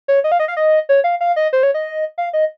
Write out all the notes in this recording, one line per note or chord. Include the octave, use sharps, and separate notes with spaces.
C#5
D#5
F5
D#5
F5
D#5
C#5
F5
F5
D#5
C5
C#5
D#5
F5
D#5